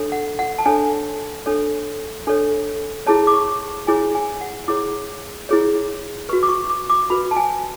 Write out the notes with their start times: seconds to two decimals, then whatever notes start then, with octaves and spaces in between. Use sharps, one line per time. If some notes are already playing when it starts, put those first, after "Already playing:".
Already playing: D4 A4 C#5
0.12 F#5
0.39 F#5
0.58 A5
0.66 D4 A4 C#5 G#5
1.46 D4 A4 C#5
2.27 D4 A4 C#5
3.07 E4 G#4 C#5 A5
3.27 D6
3.34 C#6
3.87 E4 G#4 C#5 G#5
4.15 G#5
4.41 F#5
4.68 E4 G#4 C#5 D6
5.49 E4 G#4 C#5
6.29 F#4 B4 C#6
6.43 D6
6.49 C#6
6.70 D6
6.90 D6
7.10 F#4 B4 B5
7.31 A5
7.37 G#5